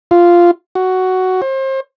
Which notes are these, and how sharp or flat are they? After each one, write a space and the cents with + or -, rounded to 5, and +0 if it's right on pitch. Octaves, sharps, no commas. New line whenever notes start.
F4 -5
F#4 +10
C5 +35